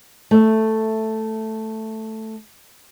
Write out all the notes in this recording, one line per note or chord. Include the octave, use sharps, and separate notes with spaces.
A3 E5